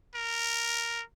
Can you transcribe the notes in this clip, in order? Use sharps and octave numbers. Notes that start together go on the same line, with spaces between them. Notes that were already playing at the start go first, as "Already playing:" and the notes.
A#4